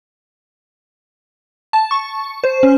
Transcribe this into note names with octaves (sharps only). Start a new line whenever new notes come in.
A5
C#6
C5
C#4